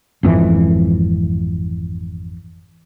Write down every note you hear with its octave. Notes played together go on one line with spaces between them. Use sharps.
G#1 F2 E3